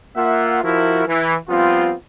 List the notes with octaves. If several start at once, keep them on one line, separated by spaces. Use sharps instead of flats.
A#3 F4 E5 F#5
F3 E4 F#4 A#4
E3
F3 G3 B3 C4 F4